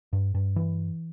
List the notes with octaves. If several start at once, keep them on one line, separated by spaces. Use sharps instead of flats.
G2
G2
E3